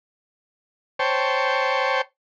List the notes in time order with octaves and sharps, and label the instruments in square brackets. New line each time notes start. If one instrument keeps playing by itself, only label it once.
[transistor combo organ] C5 C#5 G5 A5